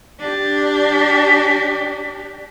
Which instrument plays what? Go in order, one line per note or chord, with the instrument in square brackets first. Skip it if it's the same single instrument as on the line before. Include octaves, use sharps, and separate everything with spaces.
[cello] D4 G4